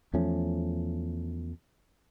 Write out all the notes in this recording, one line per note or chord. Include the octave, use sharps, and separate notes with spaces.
E2 F3 A3 C#4